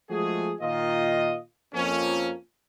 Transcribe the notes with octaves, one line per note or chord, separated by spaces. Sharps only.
F3 G#3 A3 F#4 G#4
A#2 D#3 F4 D#5
F2 A#3 C#4